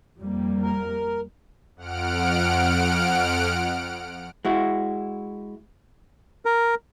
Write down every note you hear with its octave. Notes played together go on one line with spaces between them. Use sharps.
F2 G3 A#3
A#4
F2 F#5 F6 D7
G#3 E4 F#4
A#4